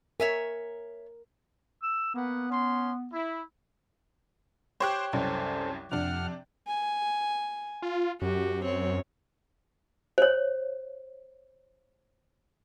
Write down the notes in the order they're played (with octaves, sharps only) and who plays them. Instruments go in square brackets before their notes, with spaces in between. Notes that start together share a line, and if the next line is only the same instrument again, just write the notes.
[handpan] A#4 [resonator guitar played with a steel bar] C#5 E5 G#5
[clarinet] E6
[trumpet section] A#3 B4 F#5 [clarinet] B3
[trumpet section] C#4 C6
E4
[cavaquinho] G4 C#5 [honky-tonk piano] C5 G5 F#6
[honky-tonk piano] C2 F#2 [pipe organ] C#4 A4 C5
[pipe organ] F2 F#5 F6 [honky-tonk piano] C3 D4
[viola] G#5
[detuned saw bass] F4
[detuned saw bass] F#2 [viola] F#4 G4
[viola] C4 C#5
[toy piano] C5 C#5